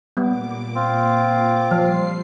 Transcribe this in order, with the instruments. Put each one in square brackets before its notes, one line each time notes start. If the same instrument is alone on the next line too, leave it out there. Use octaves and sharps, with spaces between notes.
[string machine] A#2 D6 [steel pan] G3 B3
[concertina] C4 F4
[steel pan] F3 [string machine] G3 C7